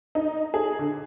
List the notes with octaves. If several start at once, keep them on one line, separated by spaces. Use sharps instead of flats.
D#4
G#4
D3